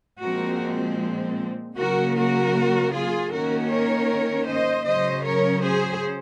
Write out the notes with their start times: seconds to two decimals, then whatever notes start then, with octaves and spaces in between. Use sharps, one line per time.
0.21 A#2 F3 G#3 C4 F#4 A#4
1.76 C#3 F#3 A#3 F#4 A#4
2.14 F#4 A#4
2.92 F4 G#4
3.30 D#3 A#3 C#4 F#4 A#4
3.69 A#4 C#5
4.46 C5 D#5
4.85 C#3 F#3 C#4 C5 D#5
5.23 A#4 C#5
5.61 G#4 C5